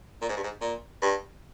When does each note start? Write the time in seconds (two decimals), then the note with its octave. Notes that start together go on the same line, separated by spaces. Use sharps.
0.22 A#2
0.29 G#2
0.37 G2
0.43 G#2
0.61 A#2
1.02 G2